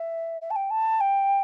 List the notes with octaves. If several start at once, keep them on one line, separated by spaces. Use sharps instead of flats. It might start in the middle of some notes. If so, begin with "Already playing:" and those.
Already playing: E5
E5
A5
G5
A5
G5